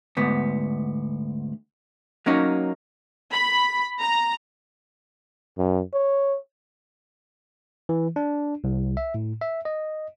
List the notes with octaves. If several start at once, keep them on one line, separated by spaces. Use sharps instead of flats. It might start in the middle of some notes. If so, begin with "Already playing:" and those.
D2 G#2 B3
F#3 A#3 C#4 D#4
B5
A#5
F#2
C#5
E3
D4
C2
E5
A2
E5
D#5